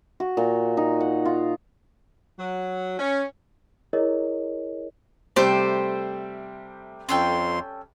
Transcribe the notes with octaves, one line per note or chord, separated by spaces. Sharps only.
F#4
A#2
D#4
F#5
F4
F#3
C#4
E4 G#4 A#4 C#5 D#5
C3 G3 A3 G4 C5 G5 G6
F2 C#4 A4 G5 C6